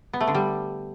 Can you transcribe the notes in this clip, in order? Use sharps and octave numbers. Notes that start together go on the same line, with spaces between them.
B3
A3
D3
G3